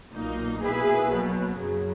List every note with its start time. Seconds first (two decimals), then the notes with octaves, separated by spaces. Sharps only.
0.14 B1 A#2 A#3 D#4
0.62 B2 A#3 E4 G#4 B4
1.09 B1 B2 F#3 A#3
1.56 F#2 C#3 F#3